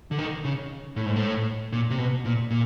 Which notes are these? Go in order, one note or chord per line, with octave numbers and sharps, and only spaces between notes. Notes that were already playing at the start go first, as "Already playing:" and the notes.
D3
D#3
C#3
A2
G#2
A2
A#2
C3
B2
A#2
A#2